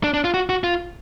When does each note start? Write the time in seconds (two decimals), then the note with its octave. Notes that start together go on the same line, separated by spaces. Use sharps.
0.04 D4
0.14 D4
0.24 F4
0.34 F#4
0.49 F#4
0.64 F4